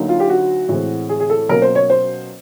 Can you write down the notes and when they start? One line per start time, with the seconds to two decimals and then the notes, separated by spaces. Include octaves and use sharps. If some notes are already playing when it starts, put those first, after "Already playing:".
Already playing: D2 D3 F#3 A#3 D#4
0.09 F4
0.20 G4
0.29 F#4
0.69 A2 E3 G#3 C4
1.09 G#4
1.20 G#4
1.30 A4
1.49 B2 F#3 A#3 C#4 A#4
1.62 C5
1.75 C#5
1.90 C5